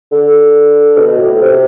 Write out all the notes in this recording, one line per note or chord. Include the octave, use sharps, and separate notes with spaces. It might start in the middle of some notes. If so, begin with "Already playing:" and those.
D3
B2
A2
C3